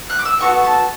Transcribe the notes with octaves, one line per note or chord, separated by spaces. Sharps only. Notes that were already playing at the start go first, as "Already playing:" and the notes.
F#6
D6
E6
B3 F#4 A4 C#6
A5